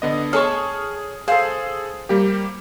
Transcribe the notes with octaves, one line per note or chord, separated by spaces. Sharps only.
D3 B3 D#5
G#4 A4 C#5 A5 C#6 F6
G#4 A4 C5 F5
G3 A#3 G4